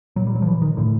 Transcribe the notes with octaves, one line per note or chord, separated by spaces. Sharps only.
A#2 F#3
G3
F#3
F3
E3
D#3
A2 D3